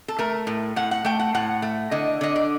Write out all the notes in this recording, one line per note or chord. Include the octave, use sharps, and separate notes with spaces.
A4
A3 A#4
A2
A2 F#5
F#5
A3 G5
F#5
A2 F#5
A3
D3 D#5
D3 D#5
D5